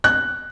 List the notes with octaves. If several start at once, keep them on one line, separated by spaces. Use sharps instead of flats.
F#6